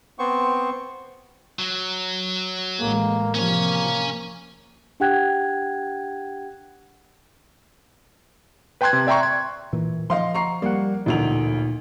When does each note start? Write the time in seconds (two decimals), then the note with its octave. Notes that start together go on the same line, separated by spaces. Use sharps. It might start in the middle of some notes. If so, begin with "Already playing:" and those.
0.19 B3 C4 C5 C#6
1.59 F#3
2.80 A1 G#3 A#3
3.35 C3 F3 A#3 C#4 C#5
5.00 D4 G4 F#5 G5 F#6 G#6
8.81 B4 G5 A5 C6 F#6 G#6
8.93 C3
9.07 D5 E5 G5 A#5 C6 C#6
9.23 G#6
9.73 A#2 E3
10.10 F3 D#5 F5 C6
10.34 A#5 C#6 C7
10.62 G3 A#3 F#5
11.06 A1 D2 A#2 D#4 F7